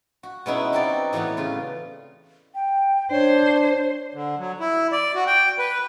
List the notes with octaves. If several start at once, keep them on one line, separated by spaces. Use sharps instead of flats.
F#4
B2 G#3 B3 C#4 D#4 E4
F#3 C4 D#4 F#4 D5
A2 E3 F#3 A3 B3
C#3 F4
G5
D4 C5 C#5
D3
F#3
E4
D5
F#4
G5
B4